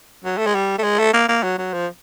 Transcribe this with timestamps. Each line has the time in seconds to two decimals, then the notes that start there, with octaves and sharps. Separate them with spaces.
0.24 F#3
0.38 A3
0.46 G#3
0.55 G3
0.78 A3
0.84 G#3
0.99 A3
1.13 A#3
1.28 A#3
1.43 F#3
1.58 F#3
1.73 F3